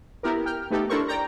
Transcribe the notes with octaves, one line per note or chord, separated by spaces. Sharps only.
B3 E4 G4 A#4
G5 F6
A3 B3 D#4 G4 A4
D4 E4 A4 A#4 C5 C#6
D5 G5 A#5